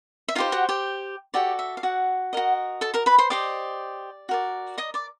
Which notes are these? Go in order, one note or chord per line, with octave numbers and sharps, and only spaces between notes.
E5
D#4 F4 G4 C5 F5
F#4 F#5
G4 G5
F#4 G4 A4 D5 G5
E5
F5
F#4 F#5
F#4 A#4 D#5
A4 A5
A#4 A#5
B4 B5
C5 C6
G4 C5 D5 D#5 D6
F#4 A#4 D5
D#5 D#6
D5 D6